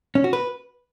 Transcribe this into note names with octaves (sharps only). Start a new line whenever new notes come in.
C#4
F#4
B4